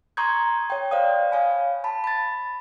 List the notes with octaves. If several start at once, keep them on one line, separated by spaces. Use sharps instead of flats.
A#5 C6 C#6 D#6 G6 G#6
C#5 G5
C5 D5 F5 D#6
C#5 F5 G#5 B5
A5 B5
B5 A6